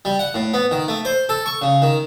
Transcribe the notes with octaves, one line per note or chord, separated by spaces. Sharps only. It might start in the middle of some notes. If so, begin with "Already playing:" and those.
G3
F#5
A2
B3
D#3
A3
C5
A4
C#6
C#3
D#3